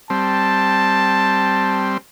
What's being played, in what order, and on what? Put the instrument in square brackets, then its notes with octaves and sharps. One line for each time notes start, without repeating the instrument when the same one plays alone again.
[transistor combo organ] G3 C4 [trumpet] A5